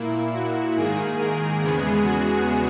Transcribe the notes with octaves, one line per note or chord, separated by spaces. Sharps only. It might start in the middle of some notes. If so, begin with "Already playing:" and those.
Already playing: A#2 A#3 E4
F#4
G#2 D#3 A#3 G#4
A#4
E2 C#3 G#3 B3 G#4
F#4